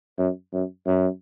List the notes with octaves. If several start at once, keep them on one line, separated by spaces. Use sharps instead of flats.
F#2
F#2
F#2